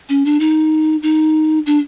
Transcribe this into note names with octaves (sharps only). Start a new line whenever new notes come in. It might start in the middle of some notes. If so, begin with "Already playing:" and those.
C#4
D4
D#4
D#4
D4